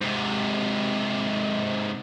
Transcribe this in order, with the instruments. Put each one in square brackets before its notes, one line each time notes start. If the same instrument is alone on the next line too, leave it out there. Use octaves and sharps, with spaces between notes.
[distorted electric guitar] G#2 C3